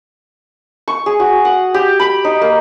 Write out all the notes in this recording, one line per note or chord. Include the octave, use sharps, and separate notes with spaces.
C#6
G#4
F#4
F#5
G4
B5
D#4
A#3